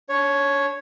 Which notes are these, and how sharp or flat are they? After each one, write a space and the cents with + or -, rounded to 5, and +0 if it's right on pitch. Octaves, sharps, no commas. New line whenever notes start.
D4 -40 C#5 +0 C#6 +0